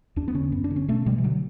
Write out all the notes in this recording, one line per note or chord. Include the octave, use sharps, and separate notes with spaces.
E2 D4
B3
D3 C#4
F#2 B3
D4
D3
C#4
B2 A3
B2 G3
E3
D3 F#3